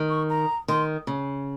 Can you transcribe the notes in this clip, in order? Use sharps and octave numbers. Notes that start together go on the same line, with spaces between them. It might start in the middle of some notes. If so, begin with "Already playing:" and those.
Already playing: D#3
C#6
A#5
D#3 C6
C#3